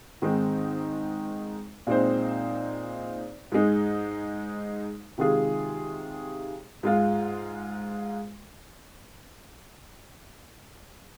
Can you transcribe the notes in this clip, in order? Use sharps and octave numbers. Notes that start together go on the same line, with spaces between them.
G#2 D#3 G#3 C4 D#4
A#2 G#3 C4 D#4 C5
G#2 G#3 D#4
C3 D#3 G#3 F4 G#4
G#2 G#3 F4